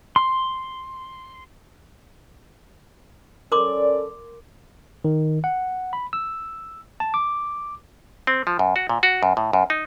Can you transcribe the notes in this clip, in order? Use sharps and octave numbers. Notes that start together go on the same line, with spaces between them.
C6
C#4 A4 A#4 D5 C6 D6
D#3
F#5
B5
E6
A5
D6
C4
F3
F#2
F#4
A#2
F#4
F#2
A2
F#2
D#4